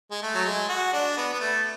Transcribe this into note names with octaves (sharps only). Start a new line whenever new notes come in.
G#3
A3
F#3
G#3
F#4
D4
B3
B3
A3